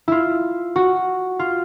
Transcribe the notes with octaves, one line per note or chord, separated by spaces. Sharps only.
E4 F4
F#4
F4